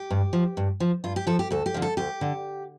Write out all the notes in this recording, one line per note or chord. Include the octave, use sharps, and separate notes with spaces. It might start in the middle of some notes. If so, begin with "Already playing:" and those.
Already playing: G4
G2
F3
G2
F3
G2 F4
G4
F3 A4
G4
D2 A4
G4
D3 F3
A4
D2 G4
D3